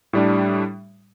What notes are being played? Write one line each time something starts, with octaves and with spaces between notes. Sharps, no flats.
A2 G3 D4